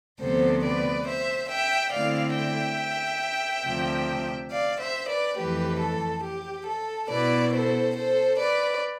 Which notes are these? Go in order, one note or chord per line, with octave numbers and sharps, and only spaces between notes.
D2 C3 F3 B3 A4 C5
B4 D5
C5 E5
E5 G5
D3 A3 C4 E4 D5 F5
E5 G5
D2 C3 F3
D5 F5
C5 E5
B4 D5
F2 E3 A3 G4 B4
A4
G4
A4
B2 B3 E4 B4 D5
A4 C5
A4 C5
B4 D5